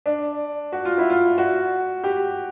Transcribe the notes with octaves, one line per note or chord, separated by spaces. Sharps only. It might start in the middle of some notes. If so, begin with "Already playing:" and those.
D4
F#4
F4
E4
F4
F#4
G4